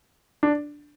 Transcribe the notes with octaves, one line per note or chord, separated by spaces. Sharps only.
D4